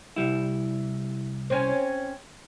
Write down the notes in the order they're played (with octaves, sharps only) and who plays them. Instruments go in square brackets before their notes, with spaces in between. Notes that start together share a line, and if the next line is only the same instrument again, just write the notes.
[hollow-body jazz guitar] C2 G3 E4
[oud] C4 C#4